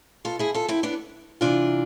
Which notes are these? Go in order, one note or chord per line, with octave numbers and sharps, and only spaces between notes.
B2 F4 A4
E4 G#4
F4 A4
C4 E4
B3 D4
C3 E3 D4 F4